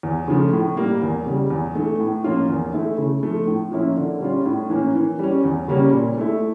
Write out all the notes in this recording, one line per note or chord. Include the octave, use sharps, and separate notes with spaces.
E2
C#3 F3 A3
A2
G3 A#3
E2
C#3 G3
E2
E3 A3
A2
F3 A#3 C#4 F4
E2
E3 A3 E4
C#3
F3 A3
A2
F3 A#3 C#4 E4
D3
G3 C#4 F4
A2
E3 A#3 C#4
E3
G3 C#4
E2
C#3 G3 A#3 C#4
A#2
A3 E4